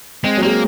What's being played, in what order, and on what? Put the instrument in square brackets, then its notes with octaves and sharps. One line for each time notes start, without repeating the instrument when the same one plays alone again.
[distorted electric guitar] G#3 [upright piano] C4
[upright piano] F#3
[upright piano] G#3 [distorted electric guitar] A#3